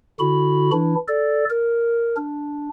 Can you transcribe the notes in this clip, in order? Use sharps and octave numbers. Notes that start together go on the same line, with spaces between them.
D3 E4 F#4 B5
E3 D4 E4
A4 D5
A#4
D4